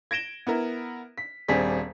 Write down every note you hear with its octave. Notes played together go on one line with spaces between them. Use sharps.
G#6 A#6 D7 E7 G7
B3 E4 A#4
B6
D#1 G3 C4 D4 G#4 B6